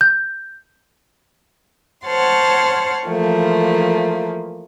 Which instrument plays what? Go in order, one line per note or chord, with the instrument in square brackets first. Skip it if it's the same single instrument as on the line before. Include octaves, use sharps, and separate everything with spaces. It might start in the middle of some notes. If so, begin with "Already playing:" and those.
[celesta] G6
[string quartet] C5 C#5 F#5 A5 C6 F6
E3 F3 A3 A#3